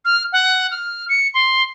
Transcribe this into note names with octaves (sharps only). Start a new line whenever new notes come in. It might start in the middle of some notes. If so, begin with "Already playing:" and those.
F6
F#5
F6
C#7
C6